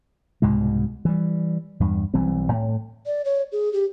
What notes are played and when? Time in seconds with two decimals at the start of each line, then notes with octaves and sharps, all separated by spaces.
0.42 C2 G#2 B2 G#3
1.05 E3 G3
1.80 E2 G2
2.14 B1 E3 G3 C4
2.52 A2
3.06 D5
3.25 C#5
3.52 G#4
3.73 G4